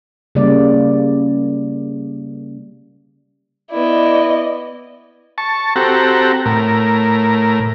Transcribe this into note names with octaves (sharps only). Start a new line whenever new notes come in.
C#3 G3 A#3 D5
B3 E4 D5 D#5
A5 C#6
C4 F#4 G4 A4 A#5
A2 A#4